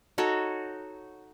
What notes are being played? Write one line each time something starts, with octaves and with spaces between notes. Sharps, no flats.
D#4 F#4 A4 C#5